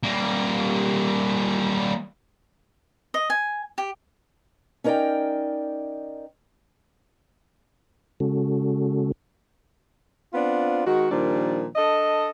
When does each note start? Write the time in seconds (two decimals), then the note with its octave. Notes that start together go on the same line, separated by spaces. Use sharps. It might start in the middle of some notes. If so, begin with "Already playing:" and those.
0.03 G3 A#3
3.14 D#5
3.30 G#5
3.78 G4
4.84 C#4 D#4 A#4 C#5 D5 G5
8.20 C#3 G#3 C#4 F#4 A4
10.34 B3 C4 D4 F4
10.86 D#3 G#3 F#4
11.11 A#2 D#3 F3 G3 D4
11.76 D4 A4 D#5